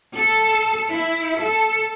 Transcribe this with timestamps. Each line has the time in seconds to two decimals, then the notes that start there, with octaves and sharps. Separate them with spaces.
0.15 A4
0.91 E4
1.39 A4